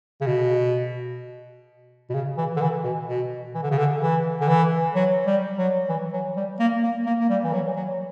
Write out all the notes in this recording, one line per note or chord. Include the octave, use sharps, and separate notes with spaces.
C#3
B2
B2
C#3
E3
D3
E3
B2
B2
E3
D3
C#3
D3
E3
D3
E3
F#3
G3
F#3
E3
F#3
G3
A#3
A#3
A#3
A#3
G3
E3
F#3
F#3